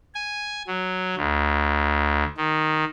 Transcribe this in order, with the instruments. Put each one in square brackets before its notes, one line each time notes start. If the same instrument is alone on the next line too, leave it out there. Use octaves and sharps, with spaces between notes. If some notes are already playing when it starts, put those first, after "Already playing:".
[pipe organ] G#5
F#3
D2
D#3